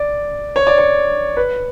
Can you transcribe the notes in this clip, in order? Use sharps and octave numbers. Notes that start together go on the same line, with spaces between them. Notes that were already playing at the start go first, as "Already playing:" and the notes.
Already playing: D5
C#5
D5
C#5
B4